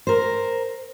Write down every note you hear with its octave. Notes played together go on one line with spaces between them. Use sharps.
A#4 C5